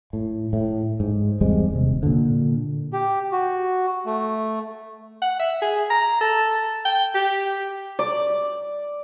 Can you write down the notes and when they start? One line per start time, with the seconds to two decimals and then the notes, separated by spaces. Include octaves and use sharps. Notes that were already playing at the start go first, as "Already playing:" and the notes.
0.13 A2
0.53 A2
1.00 G#2
1.41 E2 G3 G#3 C4
1.71 D#1 C3
2.03 A#2 D3
2.93 G4
3.32 F#4
4.06 A3
5.22 F#5
5.39 E5
5.62 G#4
5.90 A#5
6.21 A4
6.85 G5
7.15 G4
7.99 D5